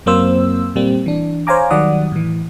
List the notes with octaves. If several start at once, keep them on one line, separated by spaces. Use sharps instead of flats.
F#2 F#3 A#3 C4 C5 E6
A#2 G3 A#3 C4
E3 D4
C5 C#5 F5 G#5 A#5 D6
D#3 F#3 G3 D5 F#5 D#6
A2 E3